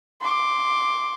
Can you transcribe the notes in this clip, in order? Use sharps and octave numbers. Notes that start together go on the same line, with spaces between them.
C6 D6